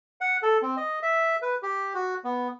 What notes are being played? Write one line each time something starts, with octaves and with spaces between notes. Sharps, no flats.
F#5
A4
C4
D#5
E5
B4
G4
F#4
B3